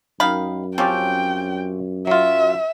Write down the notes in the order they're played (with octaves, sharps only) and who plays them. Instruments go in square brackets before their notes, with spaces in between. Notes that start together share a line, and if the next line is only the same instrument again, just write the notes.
[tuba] F#2 [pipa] D#3 F5 B5
[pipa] F3 [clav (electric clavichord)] C4 C#4 G4 [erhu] G5
[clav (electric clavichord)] F#3 F4 [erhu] E5